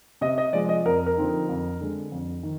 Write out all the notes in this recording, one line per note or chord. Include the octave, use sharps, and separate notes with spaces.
C3 D#5
D#5
F3 G#3 D5
D#5
F2 A#4
A#4
D3 F3 C4 D#4
F2
D3 G#3
F2
D#3